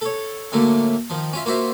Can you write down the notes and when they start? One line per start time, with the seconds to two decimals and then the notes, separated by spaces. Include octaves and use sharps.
0.01 A4 C#5
0.52 A2 D3 F#3 A3 A#3
1.10 D#3 F3
1.33 C#4 F4 E5
1.45 A#3 F4 F#4 C5 E5